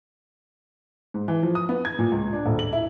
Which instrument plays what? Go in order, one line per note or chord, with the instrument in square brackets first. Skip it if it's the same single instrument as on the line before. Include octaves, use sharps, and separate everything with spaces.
[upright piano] G#2
E3
F3
D#6
B3
G#6
A#2
C#2
D4
D#1
F#7
E4